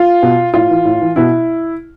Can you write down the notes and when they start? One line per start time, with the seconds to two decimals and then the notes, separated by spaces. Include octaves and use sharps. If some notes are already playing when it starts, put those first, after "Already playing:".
Already playing: F4
0.23 B2
0.54 A2 F4
0.70 E3
0.85 A2
1.02 E3
1.16 B2 E4